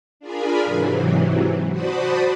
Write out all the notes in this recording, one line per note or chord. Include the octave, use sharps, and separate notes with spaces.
D4 F4 G#4 A#4 G#5 B5
G#2 C3 E3 F#3
F#4 C5 D5 A5 B5 D#6